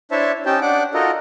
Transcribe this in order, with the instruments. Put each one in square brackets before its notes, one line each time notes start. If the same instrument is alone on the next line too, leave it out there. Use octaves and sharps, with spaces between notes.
[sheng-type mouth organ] D4 E4 C5 C#5 E5 A5
C#4 D#4 G4 G5 A5
D4 F#5 D6
D#4 F4 F#4 A4 A#4 D#5